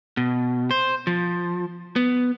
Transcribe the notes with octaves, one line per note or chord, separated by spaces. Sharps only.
B2
C5
F3
B3